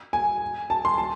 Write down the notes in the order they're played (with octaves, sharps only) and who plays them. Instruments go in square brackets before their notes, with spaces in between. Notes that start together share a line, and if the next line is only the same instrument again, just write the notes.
[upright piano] G#5
A5
C6
A5